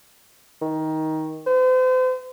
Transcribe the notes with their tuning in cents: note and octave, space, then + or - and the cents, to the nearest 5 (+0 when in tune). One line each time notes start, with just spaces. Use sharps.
D#3 +15
C5 -40